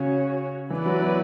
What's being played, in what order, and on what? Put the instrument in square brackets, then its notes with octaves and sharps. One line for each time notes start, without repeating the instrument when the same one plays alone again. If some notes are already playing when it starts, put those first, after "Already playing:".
Already playing: [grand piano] C#3 [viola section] C#4 F#4 C#5
[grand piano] E3 [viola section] B3 E4 B4 D5
[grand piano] F#3
F#3